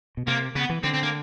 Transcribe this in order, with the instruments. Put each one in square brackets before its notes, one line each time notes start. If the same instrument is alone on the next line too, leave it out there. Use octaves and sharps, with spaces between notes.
[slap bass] B2
[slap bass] C3 [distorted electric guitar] A#3
[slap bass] C#3 [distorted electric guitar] B3
[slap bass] E3
[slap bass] D3 [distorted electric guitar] C4
[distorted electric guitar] C4
A#3